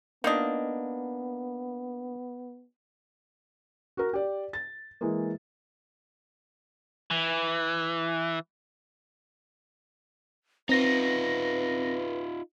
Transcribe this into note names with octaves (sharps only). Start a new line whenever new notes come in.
A#3 B3 D4 D#4 F4 D#5
F#4 A#4
G4 D5
A6
E3 G#3 A#3
E3
C4 D#4 F4 B4 A#6